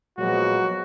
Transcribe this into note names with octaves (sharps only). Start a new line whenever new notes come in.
A#2 F3 F#3 G#3 B3 F#4